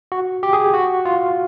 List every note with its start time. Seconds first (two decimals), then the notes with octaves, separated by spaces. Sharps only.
0.12 F#4
0.43 G4
0.53 G#4
0.74 F#4
1.05 F4